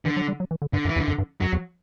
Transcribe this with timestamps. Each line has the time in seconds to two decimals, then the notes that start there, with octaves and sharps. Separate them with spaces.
0.05 D3 E3
0.17 F#3
0.28 G3
0.40 F#3
0.51 E3
0.62 D3
0.73 G2 D3
0.85 F#2 E3
0.96 E2
0.99 D3
1.08 F#2
1.18 G2
1.41 F#2 F#3
1.53 E2